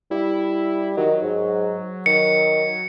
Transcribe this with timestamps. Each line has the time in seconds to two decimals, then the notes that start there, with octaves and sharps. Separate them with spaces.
0.11 G3 E4
0.97 D#3 F#3
1.22 G#2
2.06 D#3 C#7